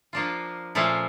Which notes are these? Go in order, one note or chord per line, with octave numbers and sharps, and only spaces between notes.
F3 A#3 D4 F4
A#2 F3 A3 C#4